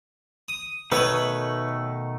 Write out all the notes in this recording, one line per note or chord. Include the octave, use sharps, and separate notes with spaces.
D#6
B2 D#3 A3 B4 C#5 F#5